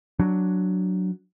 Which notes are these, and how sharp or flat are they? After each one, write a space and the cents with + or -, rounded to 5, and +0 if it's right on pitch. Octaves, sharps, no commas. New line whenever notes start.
F#3 +0 D4 +0